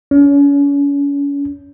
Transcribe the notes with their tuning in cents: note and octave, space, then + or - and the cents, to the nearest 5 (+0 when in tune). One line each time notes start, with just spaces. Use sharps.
C#4 +35